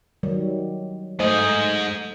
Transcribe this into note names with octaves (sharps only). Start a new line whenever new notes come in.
D#3 F#3 G3
G#2 A3 G#4 C5 D#5